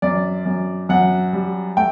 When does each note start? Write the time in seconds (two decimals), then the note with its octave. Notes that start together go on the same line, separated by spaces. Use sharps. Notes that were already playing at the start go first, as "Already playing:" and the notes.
0.02 F#2 D5
0.46 F#2
0.89 F#2 F#5
1.33 G3
1.77 A3 G5